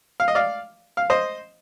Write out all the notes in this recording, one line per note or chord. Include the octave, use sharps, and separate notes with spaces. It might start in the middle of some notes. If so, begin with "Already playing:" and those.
F5
D#5
D5 F5
F5
C5 D#5